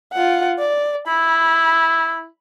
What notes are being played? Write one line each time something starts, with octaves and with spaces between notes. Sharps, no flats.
F4 F#5
D5
E4 B5